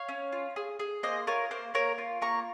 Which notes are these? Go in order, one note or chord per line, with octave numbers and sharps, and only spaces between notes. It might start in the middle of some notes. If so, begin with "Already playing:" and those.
Already playing: C#5 F5
C#4
F4
G#4
G#4
A#3 C5 D#5
F4 A#4 C#5
A#3 C5
A#3 A#4 C#5
F4
A#3 A#5 C#6